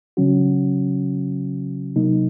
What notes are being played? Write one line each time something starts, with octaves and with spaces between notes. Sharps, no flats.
C#3 F#3 C#4 F#4
C3 F#3 A#3 D#4